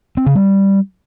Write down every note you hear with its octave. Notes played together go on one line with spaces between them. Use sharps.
C4
C#3
G3